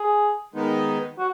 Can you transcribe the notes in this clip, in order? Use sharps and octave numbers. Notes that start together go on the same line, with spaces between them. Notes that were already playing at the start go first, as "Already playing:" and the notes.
Already playing: G#4
D#3 G#3 B3 D#4
F#4